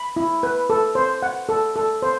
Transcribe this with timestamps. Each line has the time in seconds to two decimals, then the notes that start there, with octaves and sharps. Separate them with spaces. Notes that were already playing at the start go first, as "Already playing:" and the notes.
Already playing: B5
0.16 E4
0.43 B4
0.70 A4
0.95 C5
1.22 F#5
1.49 A4
1.76 A4
2.02 C5